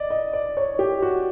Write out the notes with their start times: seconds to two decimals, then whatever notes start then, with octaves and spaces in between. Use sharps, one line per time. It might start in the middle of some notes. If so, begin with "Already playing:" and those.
Already playing: D5 D#5
0.10 D#5
0.33 D5
0.57 C#5
0.79 G4
1.02 F#4